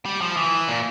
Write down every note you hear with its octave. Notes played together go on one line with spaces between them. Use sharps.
G3
F3
E3
A#2